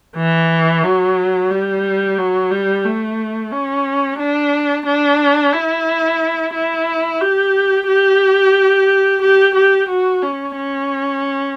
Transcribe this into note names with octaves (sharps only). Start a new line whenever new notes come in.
E3
F#3
G3
F#3
G3
A3
C#4
D4
D4
E4
E4
G4
G4
G4
G4
F#4
C#4
C#4